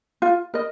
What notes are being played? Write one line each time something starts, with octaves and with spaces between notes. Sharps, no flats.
F4
A#4 D#5